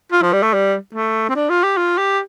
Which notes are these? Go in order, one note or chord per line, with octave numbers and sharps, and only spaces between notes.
F4
F3
G3
A3
G3
A3
C4
D4
F4
G4
F4
G4